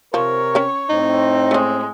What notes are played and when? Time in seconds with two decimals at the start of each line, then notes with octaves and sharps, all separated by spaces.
0.14 C3 F3 A#4 C#5
0.55 C#4 G5
0.89 A2 C4 D#4
1.51 G#3 A3 C#4